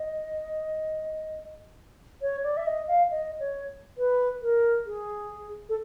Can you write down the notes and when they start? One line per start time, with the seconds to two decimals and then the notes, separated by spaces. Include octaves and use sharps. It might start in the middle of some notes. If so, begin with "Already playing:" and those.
Already playing: D#5
2.22 C#5
2.44 D5
2.57 E5
2.67 D#5
2.88 F5
3.11 D#5
3.40 C#5
3.98 B4
4.42 A#4
4.86 G#4
5.69 A4